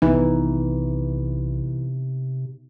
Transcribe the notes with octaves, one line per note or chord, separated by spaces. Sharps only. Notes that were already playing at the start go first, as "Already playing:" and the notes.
B1 C3 E3 B3 D#4